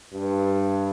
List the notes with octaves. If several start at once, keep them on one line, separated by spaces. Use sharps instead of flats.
G2